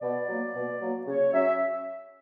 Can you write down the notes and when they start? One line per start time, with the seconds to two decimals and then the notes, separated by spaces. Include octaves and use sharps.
0.01 B2 D5
0.27 F#3 A#3
0.54 B2
0.81 F#3 A#3
1.07 C#3 C#5
1.33 F#3 C#4 E5